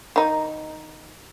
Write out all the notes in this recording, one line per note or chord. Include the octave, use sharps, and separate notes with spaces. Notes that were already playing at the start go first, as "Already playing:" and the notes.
D#3 D#4